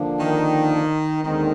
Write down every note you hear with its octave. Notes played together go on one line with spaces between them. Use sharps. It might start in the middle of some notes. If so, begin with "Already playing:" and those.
Already playing: D3 F3 A#3 D4
D#3
D#2 D3 D#3 G#3 C4